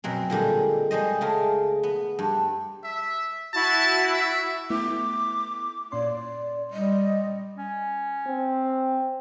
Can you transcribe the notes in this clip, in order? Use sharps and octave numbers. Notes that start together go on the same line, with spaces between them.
F#2 B2 F#3 C4
A#2 D3 G3 G#3
G3 G#3 C5 D#5
C#3 G#3 A3 A#4
B3
G2
E5
E4 F#4 A5
E5
A3 B3 E4 D6
A#2 C#4 D5 C6
G3 D#5
C#4
C4